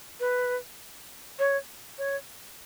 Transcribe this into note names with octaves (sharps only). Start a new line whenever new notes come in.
B4
C#5
C#5